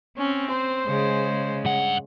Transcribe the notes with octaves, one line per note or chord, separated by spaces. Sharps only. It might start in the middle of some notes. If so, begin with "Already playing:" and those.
C4 C#4
C5
C#3 G#3
G2 F#5